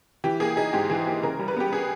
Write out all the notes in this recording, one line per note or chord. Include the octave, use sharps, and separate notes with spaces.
E3 G4
A#3 G#4
D#4 G#4
G#2 G4
E3 G#4
A#3 G4
C#3 A#4
G3
B4
B3 G4
G#4